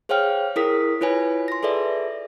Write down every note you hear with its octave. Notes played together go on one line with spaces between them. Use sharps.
G#4 C5 C#5 F5 G5 F6
E4 G#4 A#4 D#6 B6
E4 F4 B4 C#5 G#5
C6 A#6
G#4 A4 B4 D5 E5